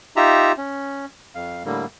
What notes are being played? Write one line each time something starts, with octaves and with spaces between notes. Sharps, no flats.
D#4 F4 G4 E5 A#5
C#4
F2 F5
A2 D3 G3 A#3